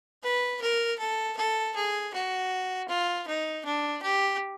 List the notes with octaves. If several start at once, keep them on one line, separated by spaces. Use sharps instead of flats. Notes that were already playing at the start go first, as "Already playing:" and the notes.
B4
A#4
A4
A4
G#4
F#4
F4
D#4
D4
G4